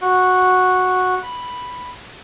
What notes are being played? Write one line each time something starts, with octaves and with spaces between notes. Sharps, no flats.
F#4
B5